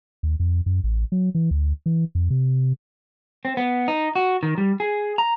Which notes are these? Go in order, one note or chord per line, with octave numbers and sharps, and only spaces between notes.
D#2
F2
F#2
A1
F#3
E3
D2
E3
F2
C3
C4
B3
D#4
F#4
D#3
G3
G#4
A#5